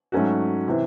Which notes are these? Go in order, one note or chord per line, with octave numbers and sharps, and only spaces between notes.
G#2 F#3 A3 C#4 F#4
C3 E3